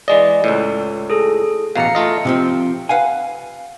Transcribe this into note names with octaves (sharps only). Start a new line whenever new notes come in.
E3 G#3 D5 D#5
C#2 A2
G#4 A4
A1 B2 F5 A#5 C#7
A3 F4 D#5
C3 F3 C4
B4 F5 F#5 G#5